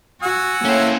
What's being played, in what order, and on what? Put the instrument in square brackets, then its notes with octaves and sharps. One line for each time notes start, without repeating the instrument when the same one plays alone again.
[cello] F#4 [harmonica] F#5 G#5 E6
[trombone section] A2 [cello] A#3 [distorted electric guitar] C#4 C5